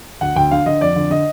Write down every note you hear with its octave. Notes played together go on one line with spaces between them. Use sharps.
D2 F#5
D2 G5
D3 F5
D3 D#5
F2 D5
D3
D3 D#5